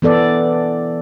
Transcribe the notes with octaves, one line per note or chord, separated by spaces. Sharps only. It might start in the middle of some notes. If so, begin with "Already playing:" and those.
E3 B3 A4 D5